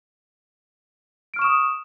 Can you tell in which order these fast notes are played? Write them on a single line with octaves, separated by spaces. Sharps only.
D7 F6 C#6 E7 D#6